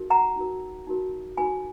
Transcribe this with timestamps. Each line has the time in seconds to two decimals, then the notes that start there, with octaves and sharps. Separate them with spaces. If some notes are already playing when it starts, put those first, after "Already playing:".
Already playing: D#4 F#4 A#4
0.10 F#5 A#5
0.36 D#4 F#4 A#4
0.87 D#4 F#4 A#4
1.37 D#4 F#4 A#4 G#5 B5